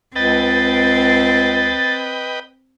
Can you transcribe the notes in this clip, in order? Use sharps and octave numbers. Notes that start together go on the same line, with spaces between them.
C#2 C4 B4 D#5 G5 A6